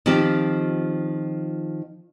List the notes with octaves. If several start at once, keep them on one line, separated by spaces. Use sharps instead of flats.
D#3 F3 C4 F4 G4